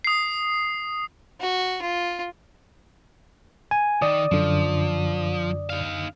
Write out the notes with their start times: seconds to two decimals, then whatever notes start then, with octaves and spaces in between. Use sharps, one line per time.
0.04 D#6 C7
1.40 F#4
1.82 F4
3.71 G#5
4.02 D#3 D5 D#6
4.32 F#2 D3 F3
5.70 D#4 F5